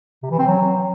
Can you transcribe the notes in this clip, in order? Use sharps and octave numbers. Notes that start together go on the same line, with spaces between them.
C3
E3
C4
F#3